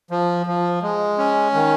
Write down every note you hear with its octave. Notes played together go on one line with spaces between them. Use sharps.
F3
F3
G#3
C#4
D#3